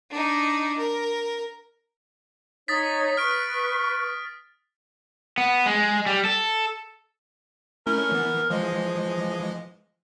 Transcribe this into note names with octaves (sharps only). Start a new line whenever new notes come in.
D4 D#4
A#4
D#4 C#5 D#6 A6 B6
B4 C#6 F6 D7
B3
G#3
G3
A4
A3 C#4 E4 A#4
E3 B3
E3 F3 G#3 D#5